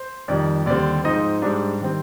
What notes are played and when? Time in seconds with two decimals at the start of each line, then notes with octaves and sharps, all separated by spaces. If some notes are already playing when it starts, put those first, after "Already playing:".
Already playing: C5
0.28 F2 D#3 G3 D5
0.66 D#2 D3 G3 C4 D5
1.04 G#2 F3 C4 D#4 D#5
1.42 G#2 G3 D4 D5
1.81 D#3 G3 C4